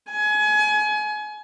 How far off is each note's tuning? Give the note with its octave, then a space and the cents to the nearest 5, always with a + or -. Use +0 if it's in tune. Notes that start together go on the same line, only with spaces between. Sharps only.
G#5 +30